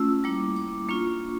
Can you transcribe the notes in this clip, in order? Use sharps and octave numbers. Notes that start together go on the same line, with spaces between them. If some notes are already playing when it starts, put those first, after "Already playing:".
Already playing: A3 C#4 F4 E6
G3 A#3 E4 D6
D6
A#3 D4 F4 C#6